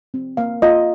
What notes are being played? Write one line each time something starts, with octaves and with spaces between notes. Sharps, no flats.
C4
A#3 F5
F4 D#5